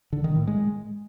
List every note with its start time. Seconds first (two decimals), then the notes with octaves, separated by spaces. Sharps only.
0.13 D3
0.24 D#3
0.36 A2
0.47 G#3